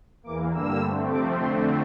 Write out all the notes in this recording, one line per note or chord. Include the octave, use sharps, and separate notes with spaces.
E2 E3 A#3 D6
G2 D3 G3 A#3 E6
G2 D3 A3 C4
C3 F3 A3 C4 D6
F2 D3 A3 C4 C6